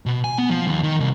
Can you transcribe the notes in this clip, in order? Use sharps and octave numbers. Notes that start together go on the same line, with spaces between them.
B2
G#5
B3
F3
D#2
D#3
C2